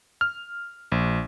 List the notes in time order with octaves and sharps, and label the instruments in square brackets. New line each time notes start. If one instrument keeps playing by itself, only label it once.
[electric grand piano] F6
A#1